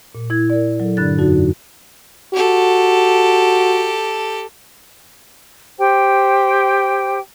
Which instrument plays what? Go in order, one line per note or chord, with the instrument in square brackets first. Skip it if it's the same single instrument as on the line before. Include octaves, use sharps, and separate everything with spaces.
[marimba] A#2
E4 G#6
A#4 D5
F#3 A4
G2 D3 D4 F#6 A6
F2 F#3 D#4 F#4
[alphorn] F#4 [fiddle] G4 A4
[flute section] G4 C5 G5